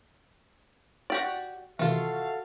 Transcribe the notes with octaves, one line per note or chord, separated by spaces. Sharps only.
F#4 G4 D5
C3 D#3 E3 A3 F4 F#4 A4 F5